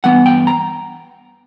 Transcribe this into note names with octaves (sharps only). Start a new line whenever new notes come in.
G2 E3 B3 F#5
G5
A#5